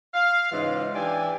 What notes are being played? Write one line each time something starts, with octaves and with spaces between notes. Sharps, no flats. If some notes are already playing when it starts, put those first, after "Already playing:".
F5
G#2 C#3 E3 G#3 F4
E3 D4 G4 D5 G#5